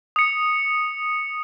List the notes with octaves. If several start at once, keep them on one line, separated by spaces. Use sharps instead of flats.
D#6 C#7